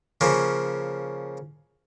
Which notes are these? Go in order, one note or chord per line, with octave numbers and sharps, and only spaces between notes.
C#3 F3 A#3 C#4